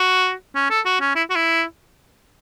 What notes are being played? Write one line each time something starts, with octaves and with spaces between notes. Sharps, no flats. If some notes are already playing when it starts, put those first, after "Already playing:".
Already playing: F#4
C#4
A4
F#4
C#4
E4
F#4
E4